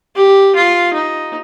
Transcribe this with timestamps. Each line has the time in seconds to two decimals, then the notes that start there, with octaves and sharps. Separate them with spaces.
0.16 G4
0.55 F4
0.94 D#4